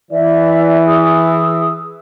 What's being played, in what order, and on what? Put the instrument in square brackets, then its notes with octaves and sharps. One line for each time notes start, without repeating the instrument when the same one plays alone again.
[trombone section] E3 [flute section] D5 E5
[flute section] G#4 D#6 E6